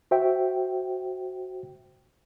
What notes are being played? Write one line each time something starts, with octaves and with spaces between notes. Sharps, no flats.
F#4 C5 E5 G5